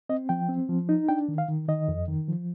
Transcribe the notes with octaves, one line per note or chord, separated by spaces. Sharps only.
C4 D#5
F3 G5
C4
F3
D#4
D4 G5
D#3
F5
D#3
D#3 D#5
F2
D#3
F3